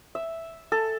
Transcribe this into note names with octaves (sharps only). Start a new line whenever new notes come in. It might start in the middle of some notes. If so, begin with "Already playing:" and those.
E5
A4